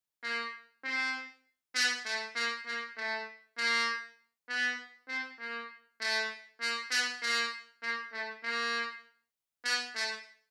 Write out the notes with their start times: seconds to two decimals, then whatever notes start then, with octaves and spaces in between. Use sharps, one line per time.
0.23 A#3
0.84 C4
1.75 B3
2.05 A3
2.35 A#3
2.66 A#3
2.97 A3
3.57 A#3
4.49 B3
5.08 C4
5.39 A#3
6.00 A3
6.61 A#3
6.91 B3
7.22 A#3
7.82 A#3
8.13 A3
8.43 A#3
9.65 B3
9.95 A3